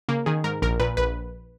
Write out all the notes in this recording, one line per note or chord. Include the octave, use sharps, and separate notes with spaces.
C#3 A#3
D#3 G#4
G#2 A#4
A#1 A#4
A#2 B4
A#1 B4